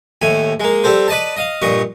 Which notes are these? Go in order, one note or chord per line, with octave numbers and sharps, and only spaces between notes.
D#2 A2 G#5
G#3 A#3
G3 C4 A4 C5
B4 D5 D#5 A5
D#5 F5
G2 A#2 D#5 C#6